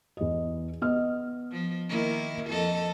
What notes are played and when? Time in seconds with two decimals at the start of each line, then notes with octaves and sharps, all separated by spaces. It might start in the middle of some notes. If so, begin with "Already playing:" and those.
0.17 E2 D#5
0.81 B3 D#5 F6
1.52 F3
1.89 D#3 A#3 E4
2.47 F2 A4 D#5